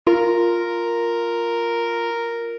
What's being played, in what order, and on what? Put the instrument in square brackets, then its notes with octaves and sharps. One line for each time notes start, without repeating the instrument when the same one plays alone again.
[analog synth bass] F4 [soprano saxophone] A#4